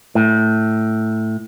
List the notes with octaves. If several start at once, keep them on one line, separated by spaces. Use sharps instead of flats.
A2